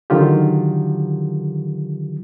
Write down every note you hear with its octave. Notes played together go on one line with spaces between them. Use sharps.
D3 D#3 F#3 F4 G4